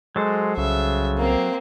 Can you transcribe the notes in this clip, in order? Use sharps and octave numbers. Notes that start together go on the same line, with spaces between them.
F#3 G#3 A4 C5
C2 C#3 E5
A#3 C4